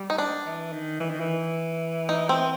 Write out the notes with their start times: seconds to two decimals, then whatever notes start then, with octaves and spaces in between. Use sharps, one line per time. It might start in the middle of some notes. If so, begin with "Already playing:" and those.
Already playing: G3
0.10 D#4
0.18 D4
0.46 E3
0.73 D#3
1.00 E3
1.10 D#3
1.20 E3
2.09 D#4
2.29 C4